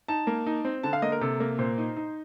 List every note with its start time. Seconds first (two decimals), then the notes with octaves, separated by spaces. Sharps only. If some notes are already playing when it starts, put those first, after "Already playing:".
0.08 D#4 A5
0.27 A#3
0.46 D#4
0.65 C4
0.83 D3 A5
0.93 F5
1.02 A#3 D#5
1.12 A#4
1.21 C3 A4
1.40 A#3
1.58 A#2 C5
1.78 D#4
1.97 D#4